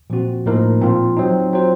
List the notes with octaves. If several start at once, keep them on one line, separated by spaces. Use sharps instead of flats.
A#2 F3 C4 F#4
A2 F3 A#3 D#4 A#4
A#2 F3 C4 F4
F#3 C4 D#4
F#3 C4 F4 C5